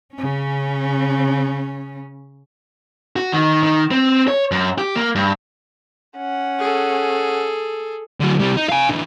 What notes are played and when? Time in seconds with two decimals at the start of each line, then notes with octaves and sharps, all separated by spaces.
0.14 C#3 C#4
3.16 F#4
3.32 D#3
3.63 D#3
3.91 C4
4.28 C#5
4.51 F#2
4.78 G4
4.96 A#3
5.15 G2
6.17 C#4 F#5
6.59 G#4 A4
8.20 D3 F#3
8.39 C3 G3
8.57 D#4
8.69 F5 G#5
8.89 D3 E3